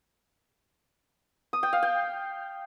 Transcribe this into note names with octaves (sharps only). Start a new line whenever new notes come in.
D#6
G5
F5
G5